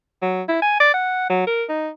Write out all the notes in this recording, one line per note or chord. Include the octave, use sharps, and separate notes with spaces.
F#3
E4
G#5
D5
F#5
F#3
A#4
D#4